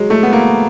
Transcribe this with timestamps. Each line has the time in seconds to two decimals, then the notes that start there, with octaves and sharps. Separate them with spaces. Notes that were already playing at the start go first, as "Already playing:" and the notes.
Already playing: F#3 G#3
0.10 A3
0.23 B3
0.33 A#3